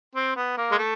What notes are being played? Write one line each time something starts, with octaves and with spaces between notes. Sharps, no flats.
C4
B3
A#3
G#3
A3